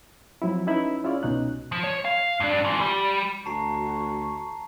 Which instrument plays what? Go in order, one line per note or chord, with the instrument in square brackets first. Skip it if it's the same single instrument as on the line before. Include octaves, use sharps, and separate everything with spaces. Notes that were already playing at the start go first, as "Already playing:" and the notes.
[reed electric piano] F3 F#3 C4 E4
C#4 D#4 E4 B4
C#4 E4 F4 G#4 C#5 D5
C2 B2 C#4 D#4 F#6
[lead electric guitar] F3
C#5
F5
G2 D4
E3 F3
G3
[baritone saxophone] D2 [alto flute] F#4 [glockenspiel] A5 A#5 C7 [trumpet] C#6